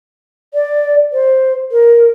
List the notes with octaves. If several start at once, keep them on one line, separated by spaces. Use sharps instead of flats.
D5
C5
A#4